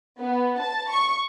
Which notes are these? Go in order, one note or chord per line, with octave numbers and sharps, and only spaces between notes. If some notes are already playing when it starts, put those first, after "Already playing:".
B3
A5
C#6